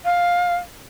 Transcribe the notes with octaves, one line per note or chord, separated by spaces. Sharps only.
F5